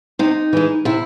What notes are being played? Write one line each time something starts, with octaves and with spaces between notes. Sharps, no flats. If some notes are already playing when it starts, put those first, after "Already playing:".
C3 D#4
E3 G#3
C3 E4